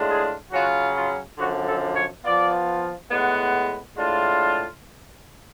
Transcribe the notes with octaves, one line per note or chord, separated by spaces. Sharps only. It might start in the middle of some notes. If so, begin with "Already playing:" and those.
Already playing: A2 G#3 D4 F4
G#4
C#3 F#3 C#4 F4 F#4
F4
F#2 D3 F3 F#4
A4
C#5
F3 B3 F4 D5
A2 G#3 B3 F#5
A2 G#3 D4 F4